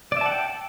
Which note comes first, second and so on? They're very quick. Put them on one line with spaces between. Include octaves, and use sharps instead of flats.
D5 E5 A5 F#5 G5